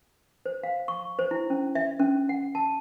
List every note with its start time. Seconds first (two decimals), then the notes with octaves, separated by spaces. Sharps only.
0.46 C5
0.63 F5
0.88 C#6
1.19 C5
1.31 E4
1.50 C#4
1.75 E5
1.99 C#4
2.29 F#5
2.55 A5